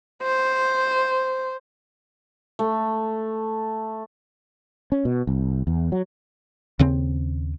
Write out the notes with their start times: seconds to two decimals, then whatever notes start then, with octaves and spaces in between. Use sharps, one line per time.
0.23 C5
2.59 A3
4.92 C#4
5.05 B2
5.27 C2
5.67 E2
5.92 F#3
6.79 D#2 C#3 C4